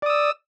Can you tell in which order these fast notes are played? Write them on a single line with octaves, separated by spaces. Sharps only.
D5 D#6 E6